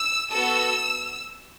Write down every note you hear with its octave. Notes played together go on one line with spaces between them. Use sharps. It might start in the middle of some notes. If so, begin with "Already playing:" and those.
Already playing: E6
B3 F#4 A4 E6